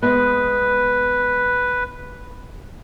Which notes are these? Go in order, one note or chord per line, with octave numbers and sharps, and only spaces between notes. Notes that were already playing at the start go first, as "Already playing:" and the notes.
G#3 B3 B4